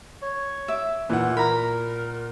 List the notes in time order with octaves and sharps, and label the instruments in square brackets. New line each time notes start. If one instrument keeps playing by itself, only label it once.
[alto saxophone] C#5
[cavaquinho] E5 D6
[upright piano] A#2 F#5 [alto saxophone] E3
[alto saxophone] A#4 [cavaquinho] A#5 B5